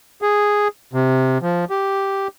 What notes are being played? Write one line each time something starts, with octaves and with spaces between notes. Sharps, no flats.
G#4
C3
F3
G4